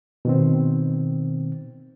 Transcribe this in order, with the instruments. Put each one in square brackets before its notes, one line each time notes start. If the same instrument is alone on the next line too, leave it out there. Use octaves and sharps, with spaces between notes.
[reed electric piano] B2 D#3 C4